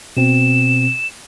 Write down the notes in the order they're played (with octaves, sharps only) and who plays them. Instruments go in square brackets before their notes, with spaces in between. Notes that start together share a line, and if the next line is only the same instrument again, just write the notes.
[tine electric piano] B2 C4 [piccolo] E7